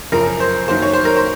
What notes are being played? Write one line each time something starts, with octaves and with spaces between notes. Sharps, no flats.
F#2 C#3 F3 A#4
C5
F#2 D#3 F#3 A#3 C5
C#5
C5
A#4
C5